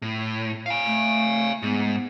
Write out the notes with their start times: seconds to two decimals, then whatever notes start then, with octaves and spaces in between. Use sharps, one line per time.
0.02 A2
0.66 F5 G#5
0.86 A3
1.63 G#2 B3